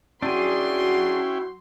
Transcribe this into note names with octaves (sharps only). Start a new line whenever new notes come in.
F#3 C#4 D4 E4 F#4 G#4 G5 C6